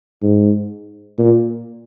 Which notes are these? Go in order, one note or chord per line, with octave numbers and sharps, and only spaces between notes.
G#2
A#2